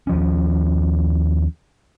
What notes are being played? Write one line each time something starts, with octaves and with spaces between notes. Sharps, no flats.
D#2 F3 C#4